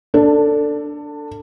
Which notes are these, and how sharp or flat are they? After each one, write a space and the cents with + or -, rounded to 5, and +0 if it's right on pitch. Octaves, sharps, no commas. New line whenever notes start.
D4 +0 A4 +20